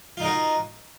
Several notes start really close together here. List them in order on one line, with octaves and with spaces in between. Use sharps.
F4 D#4 A#4 F#4